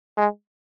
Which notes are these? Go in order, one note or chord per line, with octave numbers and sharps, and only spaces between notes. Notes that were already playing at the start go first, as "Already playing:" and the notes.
G#3